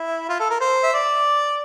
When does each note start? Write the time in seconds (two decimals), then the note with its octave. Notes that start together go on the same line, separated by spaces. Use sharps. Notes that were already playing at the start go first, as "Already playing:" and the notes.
Already playing: E4
0.29 F4
0.40 A4
0.51 A#4
0.61 C5
0.84 E5
0.94 D5